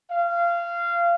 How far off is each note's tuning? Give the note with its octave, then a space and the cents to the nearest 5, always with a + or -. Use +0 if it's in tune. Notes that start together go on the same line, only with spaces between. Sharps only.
F5 -20